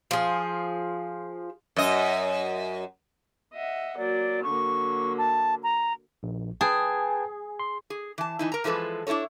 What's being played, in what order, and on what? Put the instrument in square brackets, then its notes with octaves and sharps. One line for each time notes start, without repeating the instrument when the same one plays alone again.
[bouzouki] F3 G#4
[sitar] F#2 D#5
[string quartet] D#5 E5 F#5
[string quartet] F#3 A#3 [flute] D5
[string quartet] D3 F#3 A#3 [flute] C#6
[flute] A5
A#5
[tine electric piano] A#1
[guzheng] G#4 [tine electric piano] B4 G5 A5
[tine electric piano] C6
[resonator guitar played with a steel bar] G#4
E3 A5
E3 D#4 E4
A#4 A#5
E3 F3 G#3 A4 B4
D4 E4 F4 A4 C#5